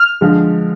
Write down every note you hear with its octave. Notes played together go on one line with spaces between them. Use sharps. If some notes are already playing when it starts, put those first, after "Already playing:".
Already playing: F6
D3 F3 G#3